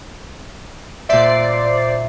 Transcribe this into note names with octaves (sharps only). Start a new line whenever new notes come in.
A#2 C5 D5 E5 C7